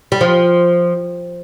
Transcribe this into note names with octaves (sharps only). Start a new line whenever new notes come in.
G3
F3